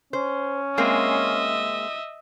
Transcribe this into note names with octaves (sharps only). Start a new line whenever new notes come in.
C#4 C5
G#3 A#3 C4 D#5 E5